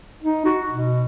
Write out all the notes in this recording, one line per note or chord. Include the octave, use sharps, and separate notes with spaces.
D#4
F#4
B2